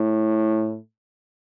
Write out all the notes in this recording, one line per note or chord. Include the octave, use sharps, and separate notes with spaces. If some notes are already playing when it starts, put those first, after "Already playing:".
Already playing: A2